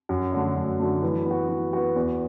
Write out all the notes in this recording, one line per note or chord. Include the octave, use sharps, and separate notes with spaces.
F#2
D3 F#3 A3
F#2
D3 F#3 A3
E3
B3 F#4
E3
B3 F#4
E2